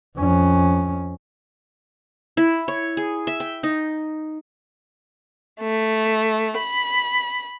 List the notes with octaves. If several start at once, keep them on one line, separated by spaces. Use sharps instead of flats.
F2 C#4
E4
C#5
G#4
E5
G5
D#4
A3
B5